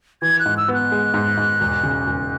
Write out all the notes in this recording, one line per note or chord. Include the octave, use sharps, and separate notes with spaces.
E3 G#6
F#6
G#2
E6
B3
F#6
G#3
G#2
G#2
E1
C#3
E1